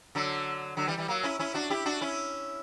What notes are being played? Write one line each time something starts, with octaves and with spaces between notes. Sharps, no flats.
D3 F#3
D3 F#3
E3 G3
E3 G3
F#3 A#3
C#4 E4
C#4 E4
D4 F#4
E4 G4
D4 F#4
C#4 E4